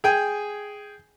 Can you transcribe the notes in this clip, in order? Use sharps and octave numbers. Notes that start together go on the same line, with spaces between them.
G#4 G5 G#5